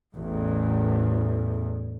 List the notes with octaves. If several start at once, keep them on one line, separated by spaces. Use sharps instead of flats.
A1 E2